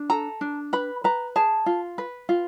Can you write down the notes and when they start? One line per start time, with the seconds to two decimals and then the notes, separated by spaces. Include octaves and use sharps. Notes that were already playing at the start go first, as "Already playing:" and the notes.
Already playing: D4
0.10 A4 A#5
0.41 D4
0.73 B4 B5
1.04 B4 A#5
1.36 G#4 A5
1.66 F4
1.98 B4
2.29 F4